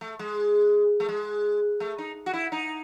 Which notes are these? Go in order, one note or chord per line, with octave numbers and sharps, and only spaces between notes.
A3
G#3
A3
G#3
A3
D#4
F#4
E4
D#4